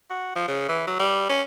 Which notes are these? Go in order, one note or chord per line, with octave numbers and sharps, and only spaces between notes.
F#4
F3
C#3
E3
F#3
G3
C#4